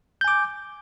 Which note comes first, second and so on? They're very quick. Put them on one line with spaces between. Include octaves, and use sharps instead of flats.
G6 G#5 D6